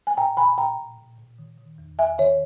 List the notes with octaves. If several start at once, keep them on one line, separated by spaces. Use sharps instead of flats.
G#5
A#2 G5 A#5
A#2 G#5 B5
A#2 G5 A#5
A#2
A#2
A#2
D#3
D#3
E2
E2 E5 G#5
D#3 C#5 E5